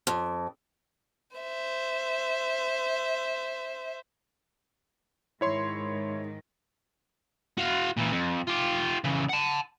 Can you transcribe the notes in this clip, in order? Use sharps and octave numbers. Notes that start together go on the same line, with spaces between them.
F2
C5 E5
G#2 D#3 E4 C#5 C6
F#4 F5
A#2 E3
F2
F4 G4
C#3 E3
F#5 A5